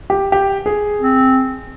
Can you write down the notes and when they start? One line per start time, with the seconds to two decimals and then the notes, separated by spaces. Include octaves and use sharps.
0.10 G4
0.32 G4
0.66 G#4
1.00 C4